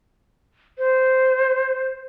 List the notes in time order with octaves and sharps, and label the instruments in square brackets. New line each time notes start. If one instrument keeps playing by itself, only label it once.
[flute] C5